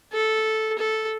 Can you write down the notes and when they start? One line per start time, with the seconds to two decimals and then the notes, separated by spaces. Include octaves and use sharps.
0.13 A4
0.78 A4